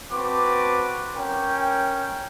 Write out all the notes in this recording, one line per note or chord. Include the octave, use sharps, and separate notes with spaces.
C4 F#4 B4 A5 D6
C#4 A#4 G5